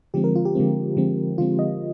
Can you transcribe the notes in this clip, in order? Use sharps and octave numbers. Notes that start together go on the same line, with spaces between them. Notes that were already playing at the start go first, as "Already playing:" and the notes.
D3 F3 G#3 C4 G4
A#4
F4
G4
D3 F3 G#3 C4
D3 F3 G#3 C4
D3 F3 G#3 C4 F4
D#5